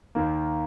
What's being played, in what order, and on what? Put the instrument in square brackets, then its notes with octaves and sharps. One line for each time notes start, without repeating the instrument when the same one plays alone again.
[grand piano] D#2 D#3 A#3